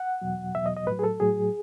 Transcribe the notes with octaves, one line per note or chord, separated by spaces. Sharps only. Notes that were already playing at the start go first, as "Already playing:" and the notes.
Already playing: F#5
E2 B2 F#3
E2 B2 F#3 E5
D#5
D#5
A2 F#3 B4
G#4
A4
A2 F#3 G#4